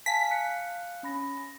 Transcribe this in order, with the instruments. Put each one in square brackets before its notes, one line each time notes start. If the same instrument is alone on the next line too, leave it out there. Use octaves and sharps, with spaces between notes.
[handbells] F5 G#5 A5 [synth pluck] B6
[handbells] F5 F#6 C#7
C#4 B5 A#6